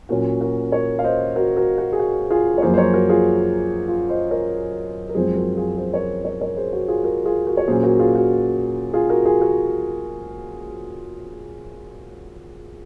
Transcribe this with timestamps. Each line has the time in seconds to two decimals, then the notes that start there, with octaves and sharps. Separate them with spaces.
0.09 A#2 F#3 C#4 F#4 A#4
0.41 F#4 A#4
0.72 A#4 C#5
0.99 F5
1.04 C5 D#5
1.36 F#4 A#4
1.57 F#4 A#4
1.78 F#4
1.93 G#4
2.00 F#4
2.31 F4 G#4
2.58 C#5
2.62 F#2 F3 A#3 G#4 C5
2.74 C5
2.78 A#4 C#5
2.94 F#4 A#4
3.09 F4 G#4
3.88 F4
4.09 C5 D#5
4.31 A#4 C#5
5.09 A#4
5.15 F#2 F3 G#3 C4 G#4 C5
5.36 F#4 A#4
5.57 F4 G#4
5.77 G#4 C5
5.94 A#4 C#5
6.25 A#4 C#5
6.41 A#4 C#5
6.57 G#4 C5
6.73 F#4
6.88 F4 G#4
7.04 F#4 A#4
7.25 F4 G#4
7.46 F#4 A#4
7.57 C#5
7.68 A#2 F#3 A#3 C#4 G#4 C5
7.83 F#4 A#4
7.99 F4 G#4
8.15 F#4
8.93 F4 G#4
9.09 F#4 A#4
9.25 F4 G#4
9.41 F#4 A#4